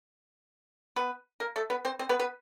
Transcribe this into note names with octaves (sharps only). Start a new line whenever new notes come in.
B3 B4
A#3 A#4
A3 A4
B3 B4
C4 C5
C4 C5
B3 B4
B3 B4